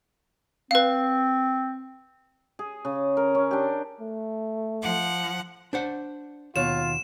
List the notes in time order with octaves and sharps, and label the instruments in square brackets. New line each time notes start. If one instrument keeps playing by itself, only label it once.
[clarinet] C4 [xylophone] B4 F5
[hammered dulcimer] G#4
C#3
A#4
C#4
D4 G4
[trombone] A3
[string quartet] F3 F#5
[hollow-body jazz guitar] D4 C5 F#5
[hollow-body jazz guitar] D#2 B2 C#5 [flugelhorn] F4 [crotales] E7